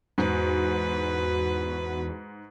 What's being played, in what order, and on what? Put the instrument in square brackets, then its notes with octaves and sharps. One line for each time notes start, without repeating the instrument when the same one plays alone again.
[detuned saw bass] E2 [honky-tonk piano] G#2 [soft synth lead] F#4 [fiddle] B4